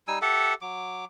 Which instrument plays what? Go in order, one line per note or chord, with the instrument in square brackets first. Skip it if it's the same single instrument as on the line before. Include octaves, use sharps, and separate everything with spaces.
[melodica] G3 D#4 G#5 E6
G4 A4 E5 F#5
F#3 D6